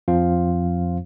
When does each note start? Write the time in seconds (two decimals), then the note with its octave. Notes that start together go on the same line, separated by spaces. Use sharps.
0.08 F2 F3 C4 F4 C5 F5